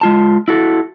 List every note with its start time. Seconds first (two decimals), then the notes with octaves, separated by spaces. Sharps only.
0.01 G#3 F4 A5
0.48 E4 F#4 A4